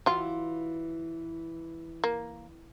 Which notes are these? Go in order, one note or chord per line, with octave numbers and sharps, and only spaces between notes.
E3 F#3 F4
A#3